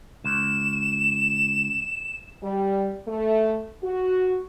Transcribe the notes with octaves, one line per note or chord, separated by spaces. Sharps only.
C#2 E7
G3
A3
F#4